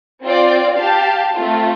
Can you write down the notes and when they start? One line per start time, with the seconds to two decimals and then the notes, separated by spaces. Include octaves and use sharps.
0.23 C4 F4 D5
0.79 G4 F5 A5
1.35 A3 C4 F4